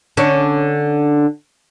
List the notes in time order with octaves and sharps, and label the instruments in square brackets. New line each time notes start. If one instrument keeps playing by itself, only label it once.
[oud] D3 C#4 D4